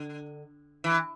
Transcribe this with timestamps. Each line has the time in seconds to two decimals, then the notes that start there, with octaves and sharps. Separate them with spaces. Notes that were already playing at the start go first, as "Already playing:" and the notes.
Already playing: D3
0.84 E3